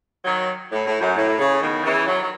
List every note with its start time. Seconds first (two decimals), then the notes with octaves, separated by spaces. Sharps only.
0.24 D#3 F#3
0.70 A2
0.85 A2
1.00 F#2
1.16 A2
1.39 C#3
1.61 B2 D#3
1.84 C#3 E3
2.06 D#3 F#3
2.22 F#3